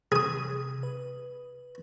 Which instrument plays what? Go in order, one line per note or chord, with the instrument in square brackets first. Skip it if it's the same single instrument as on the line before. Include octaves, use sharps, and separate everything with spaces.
[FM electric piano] C3 [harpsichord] G#4 D#6
[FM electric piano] B4